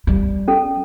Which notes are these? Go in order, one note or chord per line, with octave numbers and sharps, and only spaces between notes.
G3
C#4 A4